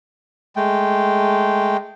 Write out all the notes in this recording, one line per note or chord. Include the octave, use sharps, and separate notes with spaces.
G#3 A3 G5